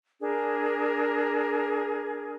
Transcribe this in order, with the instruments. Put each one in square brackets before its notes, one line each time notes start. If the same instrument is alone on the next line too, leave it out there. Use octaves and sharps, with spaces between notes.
[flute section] D4 G#4 A#4